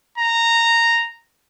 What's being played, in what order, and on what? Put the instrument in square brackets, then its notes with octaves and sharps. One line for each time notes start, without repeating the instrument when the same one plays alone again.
[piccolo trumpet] A#5